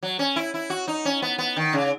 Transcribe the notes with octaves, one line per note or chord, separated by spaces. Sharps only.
F#3
C#4
E4
E4
F#4
D#4
C#4
B3
B3
D#3
C#3